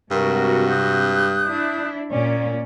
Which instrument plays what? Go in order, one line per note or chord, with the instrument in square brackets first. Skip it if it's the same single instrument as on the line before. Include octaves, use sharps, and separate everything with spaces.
[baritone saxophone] G2 [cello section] C3 G#3 F#4 [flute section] A#4
[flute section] D#6 F#6 G6
[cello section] D4 E4
[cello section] A#2 C#4 [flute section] D5